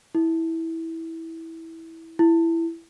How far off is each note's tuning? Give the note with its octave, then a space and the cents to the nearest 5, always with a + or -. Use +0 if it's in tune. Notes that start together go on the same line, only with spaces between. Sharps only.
E4 -15
E4 +10